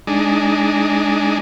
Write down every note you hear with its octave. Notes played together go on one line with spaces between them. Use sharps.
G#3 D4 D#4